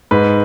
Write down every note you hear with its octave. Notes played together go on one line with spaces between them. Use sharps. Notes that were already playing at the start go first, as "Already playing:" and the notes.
G#2 B4